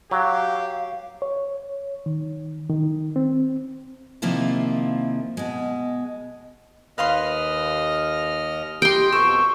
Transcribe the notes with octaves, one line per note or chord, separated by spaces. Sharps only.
F#3 G4 F5
C#5
D#3
D#3
C4
C3 D#3 F3 A#3 E4 F4
B2 G#3
D#2 B4 D#5 F5 C6 F6
G4 D#5 G5 C6
F2 B2 A4 C#6